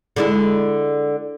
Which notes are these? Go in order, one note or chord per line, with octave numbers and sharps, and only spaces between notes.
D3 G#3 E4